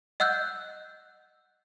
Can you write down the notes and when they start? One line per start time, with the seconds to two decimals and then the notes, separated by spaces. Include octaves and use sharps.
0.20 D#5 F#5 E6 F#6 G6